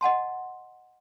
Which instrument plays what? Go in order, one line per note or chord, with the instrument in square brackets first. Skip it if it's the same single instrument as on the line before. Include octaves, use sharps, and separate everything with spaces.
[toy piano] D#5 F#5 A5 C6